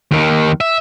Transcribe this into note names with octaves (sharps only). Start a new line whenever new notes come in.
D#2 D#3
E5